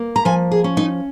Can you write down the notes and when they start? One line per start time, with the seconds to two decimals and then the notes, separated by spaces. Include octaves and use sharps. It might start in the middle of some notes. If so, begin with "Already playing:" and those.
Already playing: A#3
0.16 A#5
0.25 F3 G#5
0.51 G#4
0.64 C#4
0.77 D#4